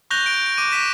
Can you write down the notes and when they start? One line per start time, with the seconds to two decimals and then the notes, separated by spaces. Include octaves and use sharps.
0.11 C#6 F#6 G6 A#6 F7 G7
0.26 G6 D7
0.46 D7
0.57 D6 D#7
0.72 A#6 B6 D#7 E7